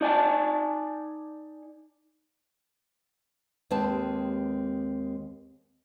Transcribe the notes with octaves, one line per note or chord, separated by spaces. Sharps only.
D#4 D5 G#5 A5
D#2 G#3 C4 G4 B4 A5